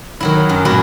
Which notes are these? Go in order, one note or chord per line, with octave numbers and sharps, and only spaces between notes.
D#3 F#3 E4
F#2
F#2 A#2 E4 F#4